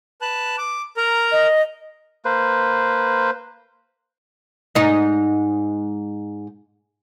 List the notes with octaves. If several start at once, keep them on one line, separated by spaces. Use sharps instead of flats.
B4 A5 F#6
D6
A#4 A#5
D#5
A#3 B4 C5
G#2 D#4